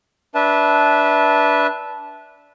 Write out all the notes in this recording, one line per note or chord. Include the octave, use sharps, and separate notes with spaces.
D4 B4 E5 A5